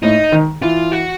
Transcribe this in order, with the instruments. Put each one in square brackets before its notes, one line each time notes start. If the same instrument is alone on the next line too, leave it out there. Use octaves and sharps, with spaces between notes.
[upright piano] A2 [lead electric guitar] D#4
[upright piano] D#3
[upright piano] E3 [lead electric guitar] F4
[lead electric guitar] F#4